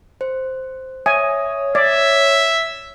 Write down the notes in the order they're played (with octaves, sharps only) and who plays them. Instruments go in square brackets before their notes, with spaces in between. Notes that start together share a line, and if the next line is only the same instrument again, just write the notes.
[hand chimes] C5
[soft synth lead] C#5 [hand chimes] E5 D#6 [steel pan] G#5
[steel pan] D5 [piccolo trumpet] E5 [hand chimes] G#6